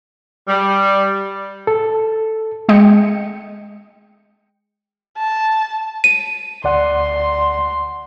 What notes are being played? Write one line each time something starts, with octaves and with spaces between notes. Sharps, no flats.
G3
A4
G#3 D#5 G5 C#7
A5
D#7
D2 D5 F#5 C6